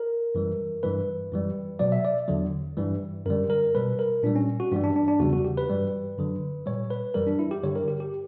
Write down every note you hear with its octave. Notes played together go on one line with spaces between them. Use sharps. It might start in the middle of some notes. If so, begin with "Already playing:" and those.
Already playing: A#4
F#2 E3 G3
G2 E3 G3 B4
F#2 E3 G3
B2 F#3 D5
E5
D5
E2 D3 F#3
G2 E3 G3
F#2 D3 G3 A#4
A#4
B2 G3 B4
A#4
A#2 G3 D4
C#4
F#4
G2 E3 G3 D4
D4
D4
D4
E2 C#3 G3 F#4
F#4
G4
B4
G2 E3 G3
F#2 D3 F#3
A#2 G3 C#5
B4
F#2 E3 G3 A#4
D4
E4
G4
G2 D3 G3 C#5
A#4
G4
G4